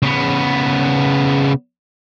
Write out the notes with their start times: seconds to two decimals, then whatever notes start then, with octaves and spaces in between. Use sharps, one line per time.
0.02 C#3 B3